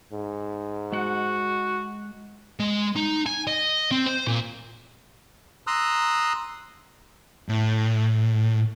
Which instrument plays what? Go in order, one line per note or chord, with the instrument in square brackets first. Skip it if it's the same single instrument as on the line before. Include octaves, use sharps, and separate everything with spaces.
[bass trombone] G#2
[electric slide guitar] G#3 F#5 [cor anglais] F#4
[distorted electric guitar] G#3
D#4
G#5
D#5
C4
C5
A#2
[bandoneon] A#5 C6 D#6 E6 F#6
[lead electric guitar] A2